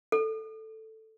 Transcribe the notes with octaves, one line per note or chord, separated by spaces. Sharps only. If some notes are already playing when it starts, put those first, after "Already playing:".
A4